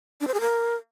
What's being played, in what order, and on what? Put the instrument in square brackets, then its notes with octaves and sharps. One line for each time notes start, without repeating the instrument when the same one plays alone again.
[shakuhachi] D4
C5
G#4
A#4